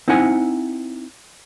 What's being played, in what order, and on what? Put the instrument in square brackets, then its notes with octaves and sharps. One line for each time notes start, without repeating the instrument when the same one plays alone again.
[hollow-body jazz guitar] C4 D#4 E4 F#5 G#5